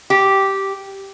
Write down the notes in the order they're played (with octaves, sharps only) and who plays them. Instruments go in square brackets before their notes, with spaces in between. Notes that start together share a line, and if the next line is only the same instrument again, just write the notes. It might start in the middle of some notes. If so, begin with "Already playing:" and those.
[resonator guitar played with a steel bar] G4